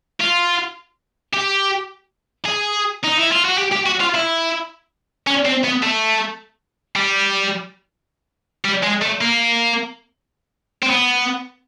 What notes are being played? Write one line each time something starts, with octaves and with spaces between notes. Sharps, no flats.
F4
G4
G#4
D#4
E4
F4
F#4
G4
G4
F#4
F4
E4
C#4
C4
B3
A3
G3
G3
G#3
A3
A#3
C4
B3